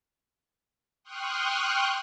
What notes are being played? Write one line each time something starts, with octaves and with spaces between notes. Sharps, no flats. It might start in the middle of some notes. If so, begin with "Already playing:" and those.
G5 C6 C#6 D#6 F6 F#6